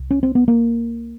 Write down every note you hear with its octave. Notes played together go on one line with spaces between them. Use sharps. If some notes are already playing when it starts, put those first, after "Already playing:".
Already playing: C2
C#4
C4
B3
A#3